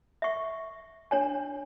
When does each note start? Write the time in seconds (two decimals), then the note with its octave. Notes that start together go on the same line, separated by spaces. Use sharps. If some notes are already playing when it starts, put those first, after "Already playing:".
0.22 E5 C#6
1.11 D4 C#5 G#5